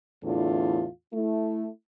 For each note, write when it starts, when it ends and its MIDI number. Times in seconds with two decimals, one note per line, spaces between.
0.24 0.86 40
0.24 0.86 45
0.24 0.86 50
0.24 0.86 62
0.24 0.86 64
0.24 0.86 65
1.13 1.68 57
1.13 1.68 64